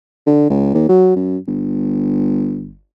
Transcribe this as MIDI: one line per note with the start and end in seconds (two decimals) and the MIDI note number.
0.27 0.48 50
0.50 0.73 37
0.75 0.88 39
0.89 1.13 54
1.16 1.37 42
1.47 2.81 31